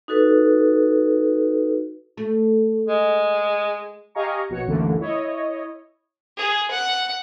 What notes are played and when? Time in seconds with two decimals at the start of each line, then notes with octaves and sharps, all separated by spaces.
0.08 D#4 F#4 A4 B4
2.17 A3
2.88 G#3
4.15 G4 D#5 F5 G#5 A#5 C#6
4.49 A#1 B2 F#4 C#5 C#7
4.67 C2 F#2 D3 E3 A3 A#3
5.00 E4 C#5 D#5
6.38 G#4
6.71 F#5